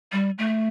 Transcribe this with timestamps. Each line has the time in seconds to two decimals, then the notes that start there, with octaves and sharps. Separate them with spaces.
0.12 G3
0.38 A3